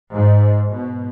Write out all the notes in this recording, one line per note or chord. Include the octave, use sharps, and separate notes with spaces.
G#2
B2